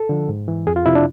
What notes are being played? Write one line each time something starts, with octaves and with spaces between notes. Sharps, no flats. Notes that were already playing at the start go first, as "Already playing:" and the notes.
Already playing: A4
D3 F3
G#2
E3
F2 G#4
F4
C3 F3 E4
D4